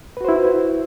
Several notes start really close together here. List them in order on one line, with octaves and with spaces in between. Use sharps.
B4 F#4 C5 E4